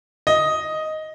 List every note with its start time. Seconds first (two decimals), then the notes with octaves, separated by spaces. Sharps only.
0.27 D#5